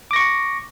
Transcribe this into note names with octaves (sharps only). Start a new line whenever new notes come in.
C#6 D6 A#6